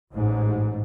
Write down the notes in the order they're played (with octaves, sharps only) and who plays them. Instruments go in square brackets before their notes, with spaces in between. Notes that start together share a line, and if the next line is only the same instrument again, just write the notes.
[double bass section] A1 G#2